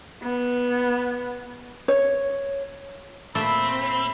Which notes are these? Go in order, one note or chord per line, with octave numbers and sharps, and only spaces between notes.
B3
C#5
A#2 A3 C4 E5 B5